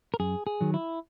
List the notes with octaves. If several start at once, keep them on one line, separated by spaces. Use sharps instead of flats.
A#4
F#2 G#4
G#4
D#3 F#3
E4